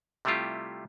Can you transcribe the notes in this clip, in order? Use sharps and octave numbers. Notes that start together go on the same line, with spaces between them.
C3 G3 A3 E4 F4 G4